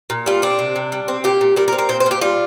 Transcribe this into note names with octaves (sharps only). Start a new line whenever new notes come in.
A#2
G3 F4
C4 D4
C3
C3
G3
C4
A#2 G4
A#2
G3 A#4
A#4
C4
A#4
A#2 C5
C5
A#2 G4
G3 F4